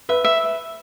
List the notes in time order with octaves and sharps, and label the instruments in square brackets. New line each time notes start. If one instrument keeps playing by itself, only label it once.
[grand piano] B4 [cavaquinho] E5
[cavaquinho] E5